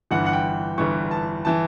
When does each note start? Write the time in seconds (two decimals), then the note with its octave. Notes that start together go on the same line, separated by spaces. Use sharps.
0.11 G1 G2 E3 F#5
0.26 F#5
0.33 G5
0.78 G1 G2 E3 C#6
1.11 A5
1.45 E3 A5